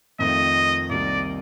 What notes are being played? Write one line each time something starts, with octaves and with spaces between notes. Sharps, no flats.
F2 D#3 A3 C4 F4 D#5
C2 C3 D#3 A#3 D5